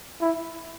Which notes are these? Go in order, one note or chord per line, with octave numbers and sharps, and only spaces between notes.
E4